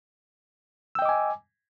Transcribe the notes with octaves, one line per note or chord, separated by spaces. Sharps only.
D#5 G5 G#5 D6 E6